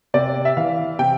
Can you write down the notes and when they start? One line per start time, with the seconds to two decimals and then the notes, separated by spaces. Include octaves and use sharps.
0.14 C3 D5
0.45 E5
0.57 E3 F5
0.99 C3 G5